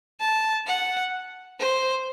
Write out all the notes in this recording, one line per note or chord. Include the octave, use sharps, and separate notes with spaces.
A5
F#5
C5